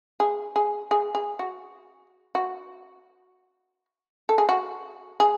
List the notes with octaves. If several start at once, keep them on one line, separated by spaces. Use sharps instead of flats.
G#4
G#4
G#4
G#4
F#4
F#4
A4
G#4
F#4
G#4